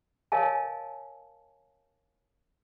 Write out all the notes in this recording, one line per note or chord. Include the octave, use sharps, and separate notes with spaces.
A#4 C#5 D#5 F5 G#5 A5